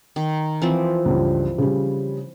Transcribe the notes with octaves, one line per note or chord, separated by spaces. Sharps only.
D#3
E3 F3 C4
C#2 G2
C#3 G3